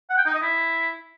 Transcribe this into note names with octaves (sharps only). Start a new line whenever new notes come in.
F#5
G5
D#4
D#5
E4